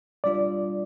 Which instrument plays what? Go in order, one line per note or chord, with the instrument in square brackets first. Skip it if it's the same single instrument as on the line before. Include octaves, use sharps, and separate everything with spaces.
[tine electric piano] G3 D4 F4 [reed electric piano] D5